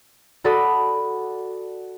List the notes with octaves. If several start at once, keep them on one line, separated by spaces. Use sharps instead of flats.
F#4 A4 D5 A5 B5 D#6